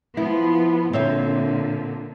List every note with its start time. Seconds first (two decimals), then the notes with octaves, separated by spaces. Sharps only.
0.17 F3 B3 E4
0.93 A#2 D3 C4 C#5 E5